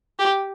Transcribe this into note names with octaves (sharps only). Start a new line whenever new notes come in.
G4